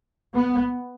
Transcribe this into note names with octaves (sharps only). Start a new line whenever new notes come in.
B3